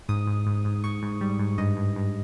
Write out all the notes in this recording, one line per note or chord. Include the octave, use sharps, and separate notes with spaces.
G#2 D#6
G#2
G#2
G#2
G#2 C#6
G#2
G3
G#2
G2 D#5
G2
G2